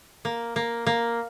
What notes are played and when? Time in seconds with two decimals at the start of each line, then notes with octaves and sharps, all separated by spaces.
0.25 A#3
0.56 A#3
0.87 A#3